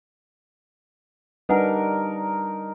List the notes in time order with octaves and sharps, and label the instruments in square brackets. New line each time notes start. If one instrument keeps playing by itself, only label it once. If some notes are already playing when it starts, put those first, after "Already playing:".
[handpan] G3 D4 [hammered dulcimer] D#4 A#4 [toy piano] B4 F#5 G#5